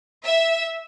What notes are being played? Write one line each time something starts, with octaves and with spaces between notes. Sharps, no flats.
E5